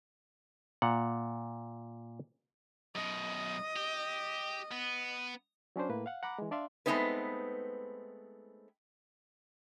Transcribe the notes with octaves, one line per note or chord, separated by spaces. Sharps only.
A#2 F#5
F#2 B2 D#5
G4
B3
F#3 C#4 D4 C5
A2 A#3 B4
F5 F#5
F#5 A#5 B5 D6
E3 G#3
D4 D5 E5 F5 C6
G#3 A3 B3 C4 D#4 B4